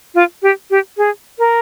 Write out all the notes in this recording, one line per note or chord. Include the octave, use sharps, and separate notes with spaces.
F4
G4
G4
G#4
A#4